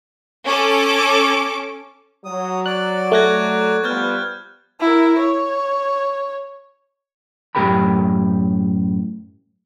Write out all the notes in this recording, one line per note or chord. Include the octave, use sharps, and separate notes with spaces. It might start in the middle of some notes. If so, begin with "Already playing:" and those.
C#4 A4 D6
F#3 D#6
D5 F#6
A3 C#6 F#6 G#6 A#6
F3 G3 B3 F6 G6 A6
E4 A#4
C#5
F#2 A2 G4 A#4 G5 B5